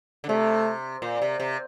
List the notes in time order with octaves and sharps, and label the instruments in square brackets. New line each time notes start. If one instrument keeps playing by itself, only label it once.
[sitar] D3
[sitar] C3 [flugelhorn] A3
[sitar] A#2
C3
C3